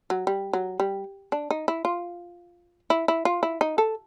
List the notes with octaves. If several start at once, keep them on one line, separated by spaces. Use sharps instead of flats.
F#3
G3
F#3
G3
D4
D#4
E4
F4
E4
E4
F4
E4
D#4
A4